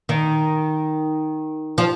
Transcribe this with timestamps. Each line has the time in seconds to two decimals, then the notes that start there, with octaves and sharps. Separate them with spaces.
0.09 D#3
1.78 F3